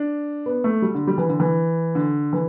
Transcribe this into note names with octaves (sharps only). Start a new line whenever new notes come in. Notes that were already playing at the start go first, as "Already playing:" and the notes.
Already playing: D4
B3
A3
G3
D3
G3
E3
D3
E3
D3
E3